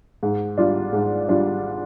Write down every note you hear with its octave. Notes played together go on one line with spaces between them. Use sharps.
G#2
G3 D4 F4
G#2
G3 D4 F4